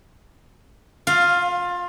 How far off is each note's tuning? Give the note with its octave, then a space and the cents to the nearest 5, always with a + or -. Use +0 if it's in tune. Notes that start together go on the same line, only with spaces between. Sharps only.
F4 +25 F5 +0